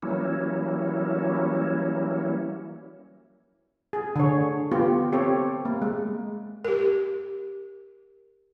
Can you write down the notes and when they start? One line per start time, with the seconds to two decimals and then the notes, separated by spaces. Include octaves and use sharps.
0.03 E3 F#3 G3 A#3 C#4 E4
3.93 G#4
4.16 D3 C#5
4.72 B3 F4 G4
5.12 C4 G4 A4 C#5
5.65 A#3
5.82 G#3
6.65 G4 A#4